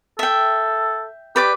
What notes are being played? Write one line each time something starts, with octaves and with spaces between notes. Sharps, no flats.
A4 E5 G5
G4 B4 D5 D6